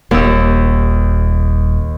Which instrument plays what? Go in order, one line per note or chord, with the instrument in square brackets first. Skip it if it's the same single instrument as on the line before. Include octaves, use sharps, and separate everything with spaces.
[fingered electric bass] D#1 [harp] D#2 E6